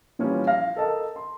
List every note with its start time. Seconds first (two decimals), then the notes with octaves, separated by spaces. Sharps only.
0.19 A#2 E3 F3 G3 C#4
0.47 F5 F6 A#6
0.76 A4 A#4 D#5 A5
1.16 C6